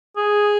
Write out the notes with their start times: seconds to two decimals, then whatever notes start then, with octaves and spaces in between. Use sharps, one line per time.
0.17 G#4